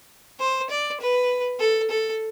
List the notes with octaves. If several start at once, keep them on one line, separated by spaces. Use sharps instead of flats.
C5
D5
B4
A4
A4